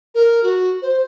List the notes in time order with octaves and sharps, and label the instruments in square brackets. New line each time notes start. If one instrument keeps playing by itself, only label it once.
[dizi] A#4
F#4
C5